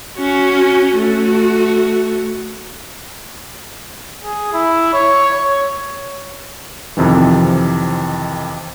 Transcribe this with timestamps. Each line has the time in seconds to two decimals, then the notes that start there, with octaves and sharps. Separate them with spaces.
0.17 C#4 F#4
0.97 A3 F#4
4.25 G#4
4.54 E4
4.93 C#5
5.33 C#5
6.97 F2 C3 D#3 E3